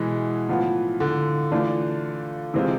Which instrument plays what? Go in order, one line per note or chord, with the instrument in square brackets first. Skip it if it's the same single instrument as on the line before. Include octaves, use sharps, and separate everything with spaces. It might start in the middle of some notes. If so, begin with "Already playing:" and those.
Already playing: [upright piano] B2 E4 [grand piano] E3 G#3
[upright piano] A2 F3 B3 F4
[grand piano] D3
[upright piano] E3 A3 D4 F4
[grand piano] C3 [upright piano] E3 G#3 C4 F4